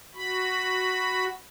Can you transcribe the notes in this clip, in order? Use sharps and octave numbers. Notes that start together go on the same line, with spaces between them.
F#4 B5